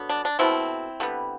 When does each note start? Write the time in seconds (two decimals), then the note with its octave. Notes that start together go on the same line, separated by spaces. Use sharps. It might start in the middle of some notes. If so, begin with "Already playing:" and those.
Already playing: D3 F#3 B3
0.09 D4
0.25 D4
0.39 B2 A3 C4 E4
1.00 D3 G3 B3